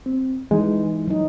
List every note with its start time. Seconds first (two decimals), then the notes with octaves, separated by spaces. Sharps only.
0.06 C4
0.51 E3 G#3 D#4
1.08 F#3 D#4